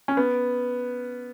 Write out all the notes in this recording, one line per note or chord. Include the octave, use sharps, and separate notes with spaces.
C#4
B3